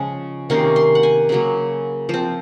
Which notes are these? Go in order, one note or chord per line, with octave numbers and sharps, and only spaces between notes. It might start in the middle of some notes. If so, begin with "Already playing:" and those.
Already playing: C#3 F3 G#3 C#4
C3 D#3 A#3 C#4 C6
C6
F#5
G#5
C#3 F#3 A#3
F3 C4